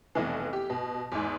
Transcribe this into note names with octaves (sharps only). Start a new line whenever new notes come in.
F1 B1 E3
G4
B2
E2 G#2